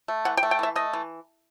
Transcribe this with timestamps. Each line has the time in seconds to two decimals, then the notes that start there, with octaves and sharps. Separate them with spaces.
0.08 A3
0.25 E3 F#5
0.37 G5
0.43 A3
0.51 G5
0.59 E3 E5
0.76 A3 D#5
0.93 E3